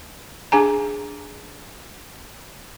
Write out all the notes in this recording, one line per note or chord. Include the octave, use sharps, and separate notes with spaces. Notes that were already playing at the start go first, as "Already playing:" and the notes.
D4 G#4 G#5 A#5